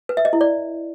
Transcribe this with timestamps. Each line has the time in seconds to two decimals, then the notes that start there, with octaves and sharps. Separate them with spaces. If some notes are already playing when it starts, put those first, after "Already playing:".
0.09 B4
0.17 E5
0.25 D#5
0.33 E4
0.41 D5